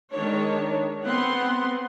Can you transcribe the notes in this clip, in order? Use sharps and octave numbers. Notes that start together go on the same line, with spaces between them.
D#3 G#3 D4 C#5
B3 C4 F#5 C6